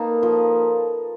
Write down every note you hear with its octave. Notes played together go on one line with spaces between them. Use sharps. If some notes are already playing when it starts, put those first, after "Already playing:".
Already playing: A#3 D#4 A4 B4
F3